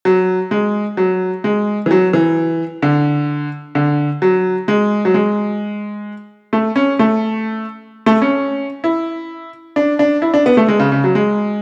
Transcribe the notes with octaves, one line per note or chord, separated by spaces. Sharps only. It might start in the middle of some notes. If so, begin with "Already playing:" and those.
F#3
G#3
F#3
G#3
E3
F#3
E3
D3
D3
F#3
G#3
F#3
G#3
A3
C#4
A3
A3
C#4
E4
D4
D4
E4
D4
B3
A3
G#3
C#3
C#3
F#3
G#3